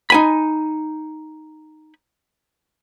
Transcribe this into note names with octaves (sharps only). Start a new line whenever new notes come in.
D#4 G#5 B5